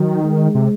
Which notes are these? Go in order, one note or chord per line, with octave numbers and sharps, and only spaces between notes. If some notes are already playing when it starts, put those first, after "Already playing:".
Already playing: D#3 F#3
G#3
C3